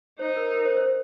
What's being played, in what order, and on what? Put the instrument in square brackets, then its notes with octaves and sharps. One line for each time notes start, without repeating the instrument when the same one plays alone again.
[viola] D#4 [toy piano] C5
[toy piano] A#4
A#4
C5
C5